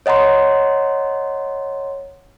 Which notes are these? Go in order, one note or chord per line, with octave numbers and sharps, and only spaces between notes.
C#5 D#5 F#5 A#5 C6